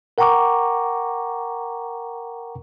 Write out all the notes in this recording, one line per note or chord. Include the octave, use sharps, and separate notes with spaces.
A#4 F#5 G5 A#5 C#6 D6